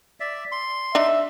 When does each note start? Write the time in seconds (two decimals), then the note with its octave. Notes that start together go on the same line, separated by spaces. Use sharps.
0.20 D5 E5
0.52 C6
0.95 D4 D#4 E5